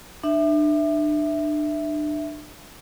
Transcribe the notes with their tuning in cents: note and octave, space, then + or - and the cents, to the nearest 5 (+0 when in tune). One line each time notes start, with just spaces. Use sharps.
D4 +35 E5 +0